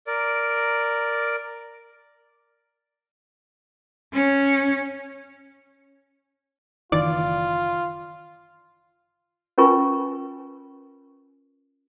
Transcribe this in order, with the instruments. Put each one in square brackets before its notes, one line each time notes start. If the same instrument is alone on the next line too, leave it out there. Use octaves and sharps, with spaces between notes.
[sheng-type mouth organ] A#4 D5
[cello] C#4
[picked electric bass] F#1 D#3 E3 [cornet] F4 [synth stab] D5
[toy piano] C#4 F4 A#4 B4 G#5 C#6